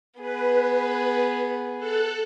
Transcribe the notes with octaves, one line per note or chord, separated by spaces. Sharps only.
B3 G#4 B4
A4 F#6